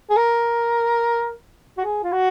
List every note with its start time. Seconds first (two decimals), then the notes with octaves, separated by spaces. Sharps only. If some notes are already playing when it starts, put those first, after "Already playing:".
0.10 G#4
0.17 A#4
1.78 F#4
1.84 G#4
2.03 F4
2.12 F#4